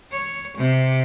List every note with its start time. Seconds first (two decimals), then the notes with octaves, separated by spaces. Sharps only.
0.12 C#5
0.58 C3